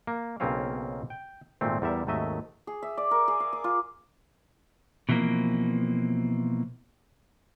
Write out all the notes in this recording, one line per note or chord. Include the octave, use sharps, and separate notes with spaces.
A#3
B1 C#3 A#3 C4 C#4 F5
G5
G#1 A#2 A3 C4
E2 G3 A#4 E5
G#1 D#2 F#3 A3 D#5 E5
G#4
E5
D5
A#4
G#4
F5
D6
F4
B2 E3 F3 G#3 A#3 C4